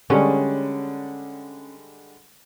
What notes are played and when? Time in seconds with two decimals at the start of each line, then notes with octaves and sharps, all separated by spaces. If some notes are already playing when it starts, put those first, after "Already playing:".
0.10 D3 G3 G#3 C#4